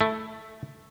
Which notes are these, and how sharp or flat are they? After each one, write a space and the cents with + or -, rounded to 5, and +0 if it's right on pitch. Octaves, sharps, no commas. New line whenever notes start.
A3 +0 E4 +0